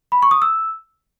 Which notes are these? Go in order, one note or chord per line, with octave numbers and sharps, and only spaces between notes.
B5
C#6
D#6
E6